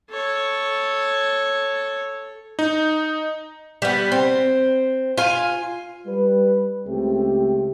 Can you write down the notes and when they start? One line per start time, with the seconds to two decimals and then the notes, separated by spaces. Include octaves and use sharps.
0.11 A4 C#5
2.59 D#4
3.82 G3 B3
4.12 C4
5.17 F4 G#5
6.07 G3 B4
6.86 C#2 A3 C4 G4